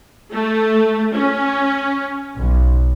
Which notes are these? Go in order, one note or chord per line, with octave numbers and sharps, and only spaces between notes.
A3
C#4
B1